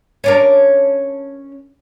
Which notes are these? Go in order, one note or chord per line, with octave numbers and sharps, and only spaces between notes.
C#4 D4 A#4